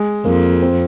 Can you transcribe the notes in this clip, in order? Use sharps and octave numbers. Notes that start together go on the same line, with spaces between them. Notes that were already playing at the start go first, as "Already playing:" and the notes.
Already playing: G#3
F2 A#3
C4